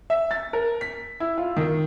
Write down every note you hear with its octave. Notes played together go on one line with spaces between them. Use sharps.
E5
A6
A#4
B6
E4
F4
D#3